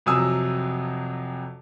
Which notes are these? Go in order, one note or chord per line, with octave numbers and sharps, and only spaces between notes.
F2 C3 F#3 G#5 D#6 E6